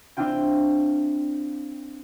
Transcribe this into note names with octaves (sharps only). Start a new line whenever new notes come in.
C4 D4 E4 F4 G5